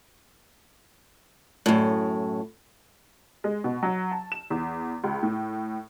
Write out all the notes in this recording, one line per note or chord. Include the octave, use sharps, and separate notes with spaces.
F#2 A2
G#3
B2
F#3
A5
E7
E2
C#2
A2